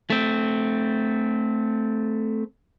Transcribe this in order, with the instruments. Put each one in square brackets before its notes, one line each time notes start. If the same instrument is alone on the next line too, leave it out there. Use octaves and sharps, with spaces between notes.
[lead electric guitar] A3 C4